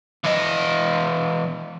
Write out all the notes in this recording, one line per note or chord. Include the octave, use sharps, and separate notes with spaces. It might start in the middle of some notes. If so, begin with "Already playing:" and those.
E2 D#5